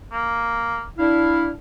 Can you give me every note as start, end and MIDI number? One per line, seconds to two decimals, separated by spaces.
0.12 0.83 58
0.99 1.50 62
0.99 1.50 64
0.99 1.50 77